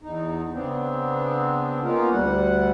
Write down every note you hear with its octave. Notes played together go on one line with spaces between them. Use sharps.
E2 D#4
C#3 B3 C4 D4
A#3 B3 C#4 D#4 F4 A#4
D2 G3 F#5